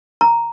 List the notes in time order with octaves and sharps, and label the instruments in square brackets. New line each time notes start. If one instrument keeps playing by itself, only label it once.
[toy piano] A#5